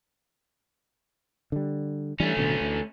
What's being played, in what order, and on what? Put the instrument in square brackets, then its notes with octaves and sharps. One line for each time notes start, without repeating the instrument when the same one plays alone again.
[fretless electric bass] D3 G3
[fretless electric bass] E3 G3 D4 [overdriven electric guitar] A3 C#4
[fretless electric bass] D1 D2 B2
D2